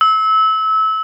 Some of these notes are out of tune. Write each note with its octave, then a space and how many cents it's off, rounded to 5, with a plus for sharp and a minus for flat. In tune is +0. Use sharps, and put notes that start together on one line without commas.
E6 -25